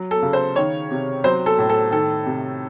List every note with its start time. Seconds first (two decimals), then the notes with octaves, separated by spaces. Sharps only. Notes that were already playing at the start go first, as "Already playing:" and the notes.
Already playing: F#3
0.11 A4
0.22 C#3
0.33 C5
0.56 D#3 C#5
0.91 C3
1.24 F#3 C5
1.46 A4
1.59 A2
1.69 A4
1.91 D#3 A4
2.26 C3